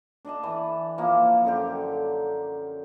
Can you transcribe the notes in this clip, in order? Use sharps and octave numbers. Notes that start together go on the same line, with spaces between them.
D4 D5 D#5 A5
E3
F3 A#3
F#2 D3 G4